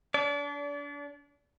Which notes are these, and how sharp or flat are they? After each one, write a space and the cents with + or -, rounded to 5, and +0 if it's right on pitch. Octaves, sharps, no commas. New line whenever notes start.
D4 -30 D5 -35